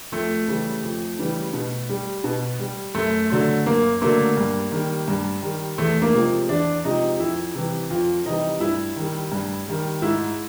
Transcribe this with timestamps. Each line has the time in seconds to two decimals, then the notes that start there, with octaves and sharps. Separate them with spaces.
0.12 F2 A3
0.48 C#3 E3 G3
0.83 F2
1.18 C#3 E3 G3
1.53 B2
1.89 G3
2.24 B2
2.59 G3
2.95 F#2 A3
3.30 D3 F#3 A3
3.66 F#2 A#3
4.01 D3 F#3 A3 A#3
4.37 G2
4.71 D#3 G3
5.08 G2
5.42 D#3 G3
5.78 E2 A3
6.02 A#3
6.14 C3 F3 G#3
6.49 E2 D4
6.84 C3 F3 G#3 D#4
7.20 F2 E4
7.54 C3 E3 G3
7.90 F2 F4
8.25 C3 E3 G3 D#4
8.61 G2 E4
8.96 D#3 G3
9.32 G2
9.68 D#3 G3
10.02 G#2 E4